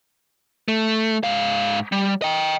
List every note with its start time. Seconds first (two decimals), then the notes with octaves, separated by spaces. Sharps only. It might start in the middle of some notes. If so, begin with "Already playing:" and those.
0.68 A3
1.24 G#2 F5
1.92 G3
2.22 D#5 G5